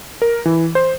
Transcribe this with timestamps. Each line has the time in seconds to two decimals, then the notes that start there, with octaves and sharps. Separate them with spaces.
0.22 A#4
0.45 E3
0.75 C5